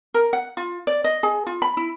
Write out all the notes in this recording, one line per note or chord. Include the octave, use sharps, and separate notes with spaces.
A#4
F#5
F4
D5
D#5
G#4
F4
B5
E4